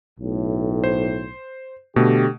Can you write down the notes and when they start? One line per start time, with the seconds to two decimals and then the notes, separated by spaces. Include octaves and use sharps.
0.20 B1 A2
0.84 C5
1.96 B2 D3 A3 G4